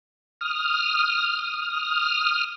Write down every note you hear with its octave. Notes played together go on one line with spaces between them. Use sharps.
D#6 F6